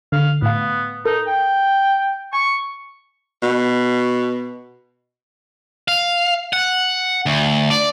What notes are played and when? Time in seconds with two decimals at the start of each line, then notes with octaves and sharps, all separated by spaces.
0.12 D3 F5
0.42 A2 B3 F5
1.05 D#4 A4 A#4
1.27 G5
2.33 G#5 C#6
3.43 B2
5.88 F5
6.53 F#5
7.26 D2
7.70 D5